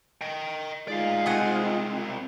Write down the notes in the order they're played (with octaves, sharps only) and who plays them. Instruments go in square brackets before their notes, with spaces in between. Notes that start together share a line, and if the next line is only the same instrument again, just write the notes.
[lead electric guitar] D#5 G5
[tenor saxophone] G#3 [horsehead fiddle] D#4 F4 [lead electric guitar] D5 F5
[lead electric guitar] C2 C4 [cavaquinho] D#5 F#5 G#5